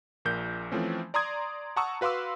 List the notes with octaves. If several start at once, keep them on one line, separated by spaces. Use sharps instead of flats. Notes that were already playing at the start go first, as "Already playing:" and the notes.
A#1 A#2 A#4 G6
E3 F3 A3 C4 C#4
D5 A#5 C6 D#6 G#6
F#5 A5 A#5 C#6 D#6 E6
F#4 B4 F5 C6 D6 E6